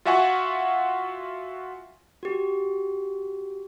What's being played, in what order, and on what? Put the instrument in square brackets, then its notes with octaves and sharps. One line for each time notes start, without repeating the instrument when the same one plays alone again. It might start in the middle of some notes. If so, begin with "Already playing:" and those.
[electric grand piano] F4 F#4 E5 F#5 G#5 C#6
[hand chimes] F#4 G4